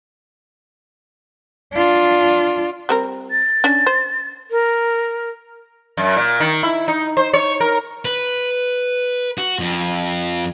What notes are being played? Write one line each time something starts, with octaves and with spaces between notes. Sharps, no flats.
D4 F4
G3 C4 A#4
A6
C#4 D4
C5
A#4
F#2
A#2
D#3
E4
D#4
C5
C#5
A#4
B4
F#4
F2